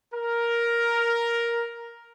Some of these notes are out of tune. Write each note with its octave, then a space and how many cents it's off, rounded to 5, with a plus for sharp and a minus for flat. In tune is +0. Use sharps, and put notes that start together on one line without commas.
A#4 +5